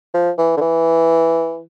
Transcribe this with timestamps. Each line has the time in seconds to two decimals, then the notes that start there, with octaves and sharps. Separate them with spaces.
0.14 F3
0.38 E3
0.57 D3
0.61 E3